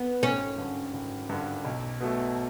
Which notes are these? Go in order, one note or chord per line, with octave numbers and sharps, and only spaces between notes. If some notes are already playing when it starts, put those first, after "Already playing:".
Already playing: B3
G#1 C#4
G2 D3
G#1
G2 D3
B1
B2 F#3 A3